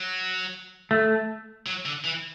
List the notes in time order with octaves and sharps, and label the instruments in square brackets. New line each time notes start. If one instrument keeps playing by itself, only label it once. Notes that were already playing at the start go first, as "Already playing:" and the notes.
Already playing: [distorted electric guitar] F#3
[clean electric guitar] A3
[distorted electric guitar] F#3
D3
E3